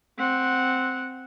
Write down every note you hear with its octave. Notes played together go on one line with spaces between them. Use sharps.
C4 F#5